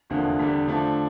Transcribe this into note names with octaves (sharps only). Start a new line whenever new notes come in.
F1 E2 D3 F3 A#3
E2 D3 G3
D3 F3 A3 D4